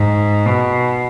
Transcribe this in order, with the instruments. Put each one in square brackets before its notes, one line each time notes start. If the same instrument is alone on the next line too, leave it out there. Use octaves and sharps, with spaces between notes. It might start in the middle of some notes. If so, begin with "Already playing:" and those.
Already playing: [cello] G#2
B2